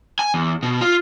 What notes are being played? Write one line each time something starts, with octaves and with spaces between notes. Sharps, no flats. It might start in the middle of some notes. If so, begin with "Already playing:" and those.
G#5
E2
B2
F4